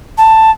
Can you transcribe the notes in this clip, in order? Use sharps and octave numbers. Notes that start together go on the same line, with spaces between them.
A5